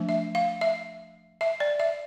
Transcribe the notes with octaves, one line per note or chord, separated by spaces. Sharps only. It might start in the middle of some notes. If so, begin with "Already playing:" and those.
Already playing: F3 A3 D4
E5
F5
E5
E5
D5
E5